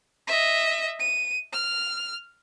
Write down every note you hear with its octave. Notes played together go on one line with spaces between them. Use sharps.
D#5 E5
D#7
F6